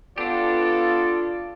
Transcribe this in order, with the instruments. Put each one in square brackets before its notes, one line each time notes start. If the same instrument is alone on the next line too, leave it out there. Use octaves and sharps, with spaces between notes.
[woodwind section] B3 A4 [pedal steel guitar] D4 G4 [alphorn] F4 [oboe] D5